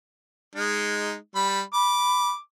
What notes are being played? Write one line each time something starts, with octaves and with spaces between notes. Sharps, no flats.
G#3 D#4
G3 B5
B5 D6